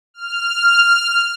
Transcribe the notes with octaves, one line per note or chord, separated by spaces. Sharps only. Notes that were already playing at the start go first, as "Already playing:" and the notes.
F6